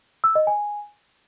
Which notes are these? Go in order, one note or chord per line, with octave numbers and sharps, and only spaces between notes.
E6
D#5
G#5